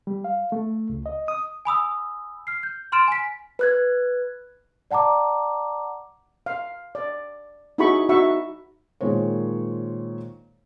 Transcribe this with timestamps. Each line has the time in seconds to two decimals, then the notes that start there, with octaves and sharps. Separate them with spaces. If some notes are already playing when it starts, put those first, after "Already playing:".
0.07 G3
0.24 F5
0.52 A3
0.89 C#2
1.06 D#5
1.28 D#6
1.65 G#5 B5 D#6 E6
2.47 F6 C7
2.63 G6
2.92 B5 C6 F6 A6 D7 E7
3.08 G#5 B6
3.59 B4 F#6 G#6
4.91 D5 F#5 A5 A#5 D6
6.46 F5
6.95 D5
7.78 D#4 E4 F#4 G#4 B5 C#6
8.09 D#4 F#4 E5 B5 C#6
9.01 A#2 D#3 G#3 C5 C#5